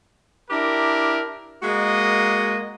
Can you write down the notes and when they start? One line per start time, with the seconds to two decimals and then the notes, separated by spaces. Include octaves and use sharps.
0.51 D4 E4 G4 A#4
1.63 G#3 A#3 F#4 D#5